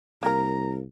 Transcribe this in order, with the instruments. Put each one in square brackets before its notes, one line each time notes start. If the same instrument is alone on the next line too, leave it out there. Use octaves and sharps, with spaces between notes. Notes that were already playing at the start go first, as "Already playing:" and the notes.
[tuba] C2 [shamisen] A#3 A#4 [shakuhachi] A#5